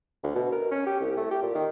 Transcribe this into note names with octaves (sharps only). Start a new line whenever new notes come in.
D2
B2
A#4
C#4
G4
C2
A3
G4
A#2
D#3